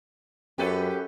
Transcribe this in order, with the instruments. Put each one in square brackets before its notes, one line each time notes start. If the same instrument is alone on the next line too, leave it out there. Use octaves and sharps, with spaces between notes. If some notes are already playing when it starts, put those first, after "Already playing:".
[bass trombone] F#2 [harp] C#4 A4 C#5 [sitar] G4 B4